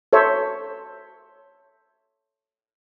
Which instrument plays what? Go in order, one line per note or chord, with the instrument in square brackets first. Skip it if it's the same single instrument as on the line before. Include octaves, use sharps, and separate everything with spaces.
[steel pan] A4 C5 C#5 E5